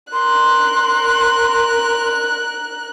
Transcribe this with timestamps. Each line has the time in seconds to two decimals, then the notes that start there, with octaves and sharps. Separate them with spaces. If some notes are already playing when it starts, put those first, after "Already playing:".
0.13 A#4 C6 F#6